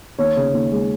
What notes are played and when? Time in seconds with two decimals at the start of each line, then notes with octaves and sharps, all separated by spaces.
0.19 D#2 C#5
0.36 C#3
0.53 D#2
0.71 G#3